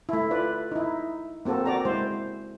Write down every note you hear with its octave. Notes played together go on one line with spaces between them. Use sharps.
A3 E4
F4 B4 D5
D#4 E4
A#3 C4 F#4 A4
F#4 D5 A#5
G#3 E4 C5